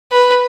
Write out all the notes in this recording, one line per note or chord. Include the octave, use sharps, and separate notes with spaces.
B4